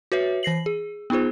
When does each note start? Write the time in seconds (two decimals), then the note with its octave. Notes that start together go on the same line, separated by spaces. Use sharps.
0.12 F#4 B4 C#5 E5
0.43 E3 A#6 C7 F#7
0.66 G#4
1.10 B3 D#4 F4 G#4 C5